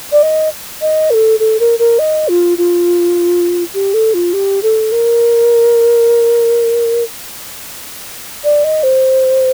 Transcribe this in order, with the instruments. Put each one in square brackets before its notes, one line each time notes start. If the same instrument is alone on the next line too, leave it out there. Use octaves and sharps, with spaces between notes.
[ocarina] D5
D#5
D#5
A#4
A4
A4
A#4
A#4
D#5
F4
F4
G4
A4
F4
G4
A4
A#4
D5
D#5
C5